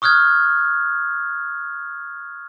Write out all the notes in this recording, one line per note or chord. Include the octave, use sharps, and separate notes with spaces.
C#6 D#6 F6 F#6 G#6